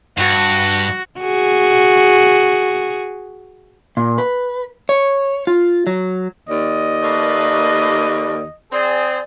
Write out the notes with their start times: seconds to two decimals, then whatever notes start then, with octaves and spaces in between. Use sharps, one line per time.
0.18 G2 F#4
1.20 F#4 G#4
3.97 A#2
4.18 B4
4.89 C#5
5.47 F4
5.87 F#3
6.49 D#2 D5 D#5
7.03 A3 A#3 B4
8.72 C4 G#4 C5 D5